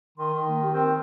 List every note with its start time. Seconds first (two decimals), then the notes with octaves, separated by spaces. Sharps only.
0.18 D#3 C6
0.33 D#3
0.48 A#3
0.62 G4
0.73 C4 A#4